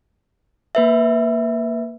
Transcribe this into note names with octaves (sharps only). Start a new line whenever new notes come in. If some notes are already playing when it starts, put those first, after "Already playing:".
A#3 B4 E5